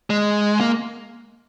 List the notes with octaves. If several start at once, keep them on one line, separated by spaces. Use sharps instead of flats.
G#3
A#3